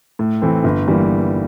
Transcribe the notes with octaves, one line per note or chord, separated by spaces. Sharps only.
A2
E3 A3 C4
G1
E3 G3 A#3